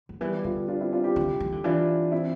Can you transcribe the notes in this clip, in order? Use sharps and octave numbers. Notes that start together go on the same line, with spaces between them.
D3
E3 G3 B3
G4
D3 F4 A4
D4 F4
C4 E4
D4 F4
E4 G4
D3
E3
D3
E3 D4 F4
C4 E4